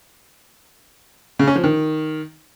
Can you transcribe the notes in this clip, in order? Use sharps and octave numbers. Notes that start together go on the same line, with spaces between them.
C#3
C#4
F3
D#3